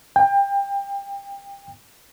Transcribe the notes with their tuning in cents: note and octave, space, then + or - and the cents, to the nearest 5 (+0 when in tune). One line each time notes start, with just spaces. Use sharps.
G5 +25